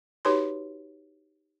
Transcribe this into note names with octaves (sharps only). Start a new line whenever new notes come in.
D#4 F#4 G4 B4 C#5 C6